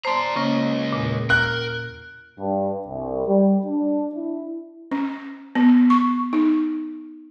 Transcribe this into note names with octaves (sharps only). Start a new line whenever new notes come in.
C5 D5 A5 A#5 C6
C#2 C#3 A#3 C#4 D#5
E2 A#2
A#4 F#6
G2
C2
G3
D4
E4
C#4
B3
C#6
D#4